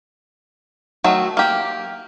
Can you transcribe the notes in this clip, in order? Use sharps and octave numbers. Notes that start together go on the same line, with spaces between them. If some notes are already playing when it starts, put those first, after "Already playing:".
D#3 F#3 A3
A#3 G4